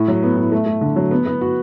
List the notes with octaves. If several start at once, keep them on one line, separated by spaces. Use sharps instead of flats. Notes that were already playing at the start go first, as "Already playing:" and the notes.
Already playing: A2
F#3
B3
A2
A3
A3
D3
F#3
B3
B3
F#4